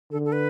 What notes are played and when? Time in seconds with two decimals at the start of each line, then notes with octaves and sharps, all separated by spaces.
0.11 D3 A4
0.25 A4
0.32 B4